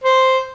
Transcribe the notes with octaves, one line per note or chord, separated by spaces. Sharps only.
C5